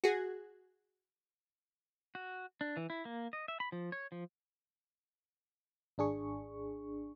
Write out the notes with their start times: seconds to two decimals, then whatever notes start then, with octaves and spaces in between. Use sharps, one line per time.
0.04 F#4 G#4
2.15 F#4
2.61 D4
2.77 E3
2.90 E4
3.05 A#3
3.33 D#5
3.48 E5
3.60 B5
3.72 F3
3.92 C#5
4.12 F3
5.98 G#1 D4 G#4 C#6